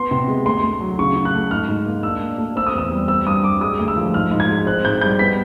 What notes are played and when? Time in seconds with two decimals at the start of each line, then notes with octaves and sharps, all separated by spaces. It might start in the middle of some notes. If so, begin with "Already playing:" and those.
Already playing: B3 C6
0.11 C3
0.28 G#3
0.45 D2 C6
0.63 D2
0.80 F#3
0.99 C#3 C#6
1.16 C#3
1.25 F#6
1.34 A3
1.51 G#2 F6
1.68 G#2
1.86 A#3
2.03 D4 E6
2.22 A#2
2.38 A3
2.56 C4 E6
2.67 D#6
2.73 E2 E6
2.91 G3
3.08 C4 E6
3.26 G2 D#6
3.44 G3 D6
3.61 G#3 D#6
3.79 D2
3.88 E6
3.96 F3
4.14 G#2 F6
4.31 G#2
4.40 G#6
4.49 G#3
4.67 C4 F#6
4.85 G#2 G6
5.01 G3 G6
5.19 B3 B6